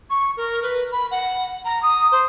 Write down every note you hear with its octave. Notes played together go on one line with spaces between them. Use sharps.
C#6
A#4
B4
B5
F#5
A#5
D#6
C5